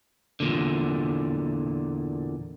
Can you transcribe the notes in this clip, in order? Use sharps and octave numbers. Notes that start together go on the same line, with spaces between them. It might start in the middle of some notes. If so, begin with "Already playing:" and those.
E2 A#2 D3